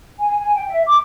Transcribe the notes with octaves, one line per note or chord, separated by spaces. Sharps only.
G#5
G#5
G5
E5
D6